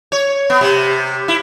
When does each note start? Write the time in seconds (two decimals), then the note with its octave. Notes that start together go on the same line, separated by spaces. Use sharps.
0.12 C#5
0.50 B3
0.61 C3
1.28 E4